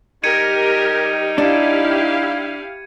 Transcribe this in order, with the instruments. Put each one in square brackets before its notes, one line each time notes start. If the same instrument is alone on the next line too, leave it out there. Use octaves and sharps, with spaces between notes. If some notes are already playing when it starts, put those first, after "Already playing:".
[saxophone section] G3 D#4 [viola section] G4 A#4 [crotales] G#6 C#7 D#7
[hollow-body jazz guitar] D4 [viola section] E4 G4 F5